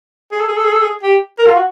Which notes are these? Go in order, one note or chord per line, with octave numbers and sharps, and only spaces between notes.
G#4
A4
G#4
A4
G#4
A4
G#4
G4
A#4
F4
F#4